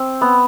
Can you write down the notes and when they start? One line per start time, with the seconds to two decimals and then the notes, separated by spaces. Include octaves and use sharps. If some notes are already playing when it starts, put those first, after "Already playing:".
Already playing: C4
0.21 B3